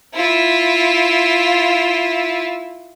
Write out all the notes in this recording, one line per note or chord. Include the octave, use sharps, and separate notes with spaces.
E4 F4